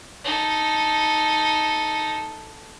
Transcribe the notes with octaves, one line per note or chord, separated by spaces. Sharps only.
D#4 A4